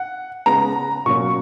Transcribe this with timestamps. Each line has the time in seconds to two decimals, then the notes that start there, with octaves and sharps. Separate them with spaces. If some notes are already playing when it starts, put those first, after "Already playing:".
Already playing: F#5
0.46 C#3 G#3 B3 A#5
1.06 B2 F#3 A#3 C#4 C#6